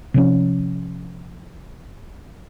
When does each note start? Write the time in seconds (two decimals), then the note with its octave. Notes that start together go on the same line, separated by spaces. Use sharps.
0.14 C3 F3 C#4